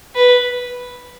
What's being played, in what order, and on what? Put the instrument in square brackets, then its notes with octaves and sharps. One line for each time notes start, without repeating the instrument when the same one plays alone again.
[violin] B4